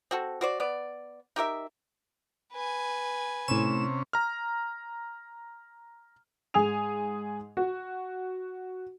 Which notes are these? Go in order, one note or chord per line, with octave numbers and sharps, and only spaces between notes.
C4 F#4 A4
F#4 C5 D5
B3 D5
D#4 G4 A#4 E5
B4 G#5
A2 C3 C#4 E7
A#5 F6
G#2 G#4 G#5 D#6 F7
F#4